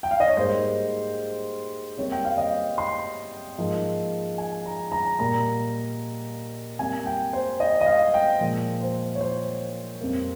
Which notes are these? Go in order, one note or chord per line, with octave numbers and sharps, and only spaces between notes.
G5
F5
D#5
C#5
G#2 G3 A#3 C5
C3 G3 A#3 C#5
G5
F5
D#5
C6
G#2 F3 A#3
G#5
A#5
A#5
A#2 G3 A#3 A#5
C3 G3 A#3 G#5
G5
C5
D#5
D#5
F5
G5
A#2 F3 G#3
C5
C#5
C5
F2 C3 G3 A#3